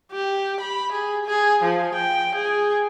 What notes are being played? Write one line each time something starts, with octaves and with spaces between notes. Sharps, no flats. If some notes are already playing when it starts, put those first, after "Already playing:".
G4
B5
G#4
G#4
F3
G5
G#4